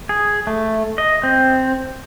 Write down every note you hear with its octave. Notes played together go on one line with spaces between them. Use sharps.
G#4
A3
D#5
C4